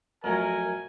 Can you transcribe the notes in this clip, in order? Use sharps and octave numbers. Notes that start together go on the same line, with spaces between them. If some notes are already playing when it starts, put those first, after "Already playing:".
F2 F#3 A3 A#4 G#5